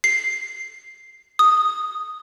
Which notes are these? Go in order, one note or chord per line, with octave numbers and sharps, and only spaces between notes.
C7
D#6